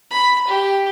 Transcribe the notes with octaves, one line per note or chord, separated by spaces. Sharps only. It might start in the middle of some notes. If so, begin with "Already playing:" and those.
B5
G4